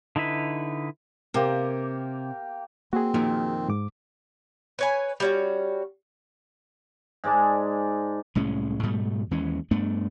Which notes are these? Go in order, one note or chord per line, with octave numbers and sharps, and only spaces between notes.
D3 D#4 E4 B4
C3 A#3 G4 A#4
A#3 C4 F#4 G#4
F2 A#2 D#3
G#2 D6
B4 C#5 G#5
G3 C#4 F#4
G#2 G#3 D5 A5
C2 A2 G#3 C#4
G#2 B2 G3 A3
D#2 E3 G#3 C#4
G2 A3 B3 D4